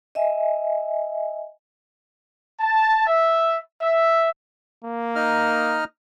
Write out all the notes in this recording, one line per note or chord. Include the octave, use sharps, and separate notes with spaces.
D#5 E5 G#5
A5
E5
E5
A#3
D#4 D#5 F6